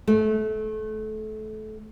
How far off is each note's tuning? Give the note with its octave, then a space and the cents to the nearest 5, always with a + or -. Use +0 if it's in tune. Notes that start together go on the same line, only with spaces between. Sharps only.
A3 -25